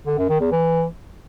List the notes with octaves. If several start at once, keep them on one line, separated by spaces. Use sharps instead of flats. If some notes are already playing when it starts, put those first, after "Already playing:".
D3
F#2
D#3
E2
E3